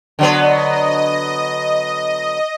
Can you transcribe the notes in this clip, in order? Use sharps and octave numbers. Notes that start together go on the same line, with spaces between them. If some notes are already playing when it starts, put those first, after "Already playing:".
D3 F#3 B3 D#5